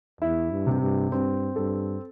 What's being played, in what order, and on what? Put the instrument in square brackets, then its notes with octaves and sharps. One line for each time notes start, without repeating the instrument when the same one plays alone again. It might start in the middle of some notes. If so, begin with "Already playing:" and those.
[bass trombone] E2 [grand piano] E4
[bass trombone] G2
[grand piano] C3
[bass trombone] G2
[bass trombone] G2 [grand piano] C4
[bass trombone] G2 [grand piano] A4